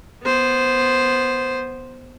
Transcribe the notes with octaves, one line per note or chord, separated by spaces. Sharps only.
B3 C5